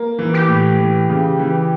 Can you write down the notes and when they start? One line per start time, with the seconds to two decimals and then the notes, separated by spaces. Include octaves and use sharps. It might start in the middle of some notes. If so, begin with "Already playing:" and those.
Already playing: A#3
0.19 E3
0.34 G4
0.48 A2
0.79 E3
1.09 C#3
1.39 E3